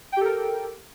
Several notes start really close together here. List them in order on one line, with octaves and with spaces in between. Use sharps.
G5 G4 A4 A#4